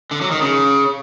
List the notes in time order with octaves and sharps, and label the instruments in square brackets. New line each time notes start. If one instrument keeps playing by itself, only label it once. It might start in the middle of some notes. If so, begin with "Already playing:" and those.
[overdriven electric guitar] D3
F#3
D#3
C#3